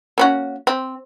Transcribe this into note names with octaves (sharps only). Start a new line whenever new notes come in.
A#3 C#4 F#4
C4